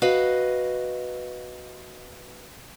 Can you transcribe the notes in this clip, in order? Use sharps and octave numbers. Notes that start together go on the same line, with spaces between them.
F#4 B4 D#5 F5